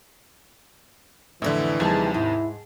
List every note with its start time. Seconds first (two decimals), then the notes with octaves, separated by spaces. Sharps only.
1.42 F2 A2 D3 E3 A4 D5 E5
1.80 D#2 C3 F3 G3 D#4 G#4 A5
2.14 G#2 E4